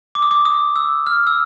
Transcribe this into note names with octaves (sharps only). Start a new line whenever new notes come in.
D6
D#6
D6
D#6
E6
F6
E6